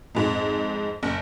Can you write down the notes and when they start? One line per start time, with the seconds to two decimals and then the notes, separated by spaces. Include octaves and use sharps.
0.15 F2 G#2
1.03 F#1